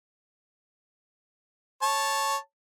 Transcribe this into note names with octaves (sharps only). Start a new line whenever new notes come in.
C#5 A5